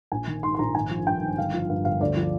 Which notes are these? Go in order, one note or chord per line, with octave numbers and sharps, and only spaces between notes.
A#1 G#5
D#3
G#2 C6
C6
A#1 A#5
G#1 G#5
F3
G2 G5
G#1
G1 F5
F3
G2 F5
G1 F5
D2 D5
F3